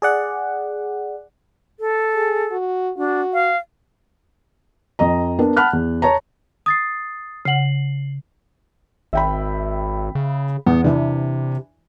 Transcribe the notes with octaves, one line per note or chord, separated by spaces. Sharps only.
G#4 D5 F#5
A4
G#4
F#4
D4 F#4
F5
F2 D#5 A#5
B3 D4 A#4
F#5 A5 B5 F6 F#6
E2
C#5 A5 A#5
D#6 A6 C7
C#3 F#5 C7 F#7
G#1 E5 G5 B5
C#3
E2 B3
C3 E3 D4